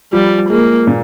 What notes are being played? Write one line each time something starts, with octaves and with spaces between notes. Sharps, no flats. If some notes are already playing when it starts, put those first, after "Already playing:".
F3 G3
G#3 A#3
A#2